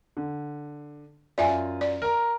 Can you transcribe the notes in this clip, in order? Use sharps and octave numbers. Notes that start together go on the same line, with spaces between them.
D3
F#2 F4 D5 E5 G#5
D5
A#4 A#5